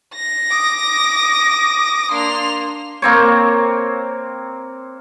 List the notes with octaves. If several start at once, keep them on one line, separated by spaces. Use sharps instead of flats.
A#6
D6 D#6
A#3 D4 C6 F7
A#3 C4 C#5